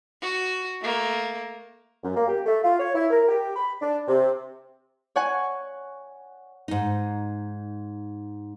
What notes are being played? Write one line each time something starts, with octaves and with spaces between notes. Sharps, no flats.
F#4
A3 A#3
F#2
A#3
G4
A3
F4
C#5
E4
A#4
G4
B5
D4
C3
C#5 F#5 G#5
G#2 D#4